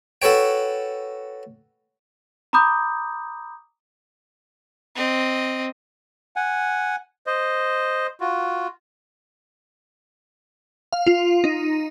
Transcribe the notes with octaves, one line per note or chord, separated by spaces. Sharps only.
F#4 A4 B4 C#5 G5
A#5 B5 D6 D#6 G6
C4 D#5
F#5 G#5
C5 D#5
F4 F#4
F5
F4
D#4